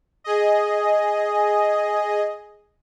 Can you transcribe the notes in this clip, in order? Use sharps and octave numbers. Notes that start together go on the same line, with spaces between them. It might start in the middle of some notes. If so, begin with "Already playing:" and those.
G#4 D#5